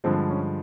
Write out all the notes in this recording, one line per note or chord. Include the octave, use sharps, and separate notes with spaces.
G2 D3 F3 G#3 C4
C#4